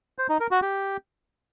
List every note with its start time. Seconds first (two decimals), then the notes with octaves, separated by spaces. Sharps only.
0.19 C5
0.29 D#4
0.40 A#4
0.51 F#4
0.62 G4